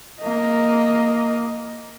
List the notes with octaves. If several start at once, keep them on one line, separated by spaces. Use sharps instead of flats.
A#3 D#5